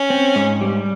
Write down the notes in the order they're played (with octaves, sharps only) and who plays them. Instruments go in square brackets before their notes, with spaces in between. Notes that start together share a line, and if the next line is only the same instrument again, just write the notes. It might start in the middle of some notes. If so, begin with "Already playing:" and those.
Already playing: [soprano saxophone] C#4
[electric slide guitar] C4
G#2
G3